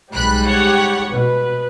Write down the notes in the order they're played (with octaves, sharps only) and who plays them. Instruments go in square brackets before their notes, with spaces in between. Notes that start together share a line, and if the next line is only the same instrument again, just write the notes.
[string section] B1 B5 F#6 [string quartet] G#2 G3
[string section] G4 C#5 F#5
[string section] B2 [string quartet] B4